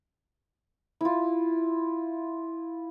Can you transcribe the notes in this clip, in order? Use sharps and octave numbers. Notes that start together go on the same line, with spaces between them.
E4 F4